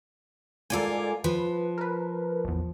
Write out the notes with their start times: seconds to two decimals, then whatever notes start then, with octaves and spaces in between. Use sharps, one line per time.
0.70 G#2 F4 A4 A#4 D5 G#5
1.24 F3 B4
1.78 A#4 B4
2.45 A1 E2